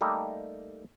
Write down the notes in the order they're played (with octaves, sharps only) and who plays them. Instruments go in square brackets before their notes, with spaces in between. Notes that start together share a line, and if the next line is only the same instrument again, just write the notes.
[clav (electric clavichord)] G3 A3 A#3 D#4 G4